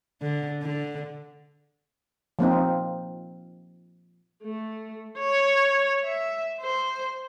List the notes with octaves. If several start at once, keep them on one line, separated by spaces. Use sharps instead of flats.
D3
D3
F3 A#3 C4 D#4
A3
C#5
E5
C5